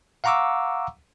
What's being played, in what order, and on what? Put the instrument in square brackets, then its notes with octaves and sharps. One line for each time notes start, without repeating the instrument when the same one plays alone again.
[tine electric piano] F5 F#5 A#5 C#6 D6 E6